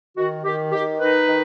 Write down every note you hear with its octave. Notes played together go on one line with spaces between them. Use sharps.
D#3 F#4
D#3 G4
D#3 G4
D#4 B4
D#3